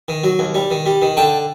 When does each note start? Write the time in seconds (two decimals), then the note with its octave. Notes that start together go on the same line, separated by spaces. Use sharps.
0.08 D#3
0.24 F#3
0.39 D#2
0.55 G3
0.71 D#3
0.86 G3
1.02 D#3
1.17 D3 G5 A5